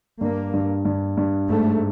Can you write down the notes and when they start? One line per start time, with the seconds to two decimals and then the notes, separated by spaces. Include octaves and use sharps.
0.21 G2 A#3
0.54 G2
0.85 G2
1.17 G2
1.49 G#2 A3